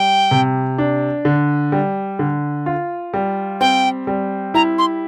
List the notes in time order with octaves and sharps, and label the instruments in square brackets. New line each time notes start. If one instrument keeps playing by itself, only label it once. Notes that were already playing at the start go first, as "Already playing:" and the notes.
Already playing: [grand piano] G3 [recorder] G5
[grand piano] C3
D4
D3
G3
D3
F4
G3
[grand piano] C4 [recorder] G5
[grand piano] G3
[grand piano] E4 [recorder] A#5
[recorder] C6